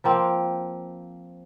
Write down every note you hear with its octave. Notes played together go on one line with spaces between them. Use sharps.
F3 A#3 C4